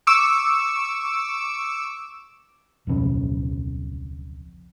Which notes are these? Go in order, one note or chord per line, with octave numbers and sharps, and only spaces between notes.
C#6 D6 E6
D1 B1 F2 C#3